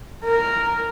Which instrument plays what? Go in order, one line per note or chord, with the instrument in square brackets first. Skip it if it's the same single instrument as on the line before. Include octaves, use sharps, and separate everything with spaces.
[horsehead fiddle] A#4